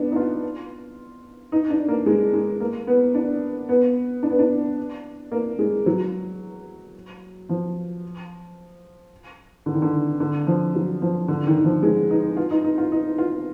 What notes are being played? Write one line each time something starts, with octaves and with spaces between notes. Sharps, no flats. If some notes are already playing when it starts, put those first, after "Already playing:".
Already playing: B3 D4
D#4
F4
D#4
D4
A#3
G#3
G#3
A#3
B3
D4
B3
D4
B3
D4
A#3
G#3
F#3
F3
D3
D#3
D3
D3
F3
F#3
F3
D3
D#3
D#3
F3
G#3
D#4
F4
D#4
D#4
F4
D#4
F4